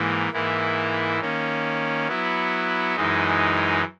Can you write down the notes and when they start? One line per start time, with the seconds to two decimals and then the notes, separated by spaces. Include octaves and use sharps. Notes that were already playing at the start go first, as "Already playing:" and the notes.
Already playing: G#2 E3 A#3
0.32 G#2 E3 A#3 E4
1.20 D#3 A#3 C#4
2.08 F#3 B3 E4
2.95 F#2 E3 G#3 D#4